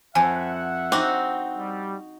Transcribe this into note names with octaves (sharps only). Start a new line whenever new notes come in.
F2 E5 F#5 G#5
C4 D#4 F#4 D6
G3